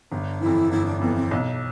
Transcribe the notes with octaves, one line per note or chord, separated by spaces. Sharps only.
G1 D4
F2 E3 E4
G1 E4
D4
F2 E3 B3
C4
B1